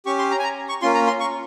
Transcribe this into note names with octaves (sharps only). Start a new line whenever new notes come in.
C#4 G4 C#6
C6
A#5
G#5
A#5
C#6
A#3 C#4 F4 C6
A#5
C6
C#6